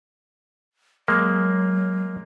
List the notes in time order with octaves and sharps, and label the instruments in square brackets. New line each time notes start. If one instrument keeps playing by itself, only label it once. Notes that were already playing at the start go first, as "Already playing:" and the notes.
[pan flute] F#3 [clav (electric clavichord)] G#3 A#3